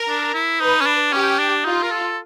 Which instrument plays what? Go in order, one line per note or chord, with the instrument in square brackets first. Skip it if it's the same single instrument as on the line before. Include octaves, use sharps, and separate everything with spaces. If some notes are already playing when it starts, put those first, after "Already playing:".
Already playing: [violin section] A#4
[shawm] D4
E4
[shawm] D#4 [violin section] B4
[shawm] C#4
D4
[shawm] C#4 [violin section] G4
[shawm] D4
[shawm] D#4 [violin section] F4
[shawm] A#4
A4